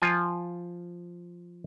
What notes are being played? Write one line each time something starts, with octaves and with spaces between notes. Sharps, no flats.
F3 F4 G#5